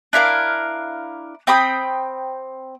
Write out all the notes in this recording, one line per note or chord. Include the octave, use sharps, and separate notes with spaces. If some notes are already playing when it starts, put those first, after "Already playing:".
D4 E4 A#4 F5
C4 G5 B5 D#6